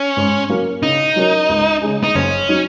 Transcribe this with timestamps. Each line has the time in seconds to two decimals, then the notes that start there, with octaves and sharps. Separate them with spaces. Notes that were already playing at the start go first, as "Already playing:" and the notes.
Already playing: C#4
0.17 G#2
0.49 F#3 A#3 C#4 A#4
0.83 C#3 D#4
1.16 F#3 C#4 A#4
1.49 C#2
1.82 C#3 G#3
2.04 D#4
2.15 F#1 C#4
2.48 F#3 D#4